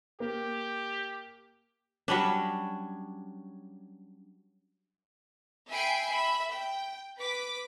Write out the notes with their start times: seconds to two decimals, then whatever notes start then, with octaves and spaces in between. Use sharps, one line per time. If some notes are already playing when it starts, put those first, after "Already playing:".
0.20 A#3 G4
2.08 F#3 G3 C#4 D4
5.70 E5 G5 G#5 B5 C7 D7
6.11 E5 B5
6.49 G5
7.18 B4 D6 B6